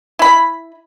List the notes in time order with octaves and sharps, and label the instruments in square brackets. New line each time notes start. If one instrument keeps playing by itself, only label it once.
[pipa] E4 B5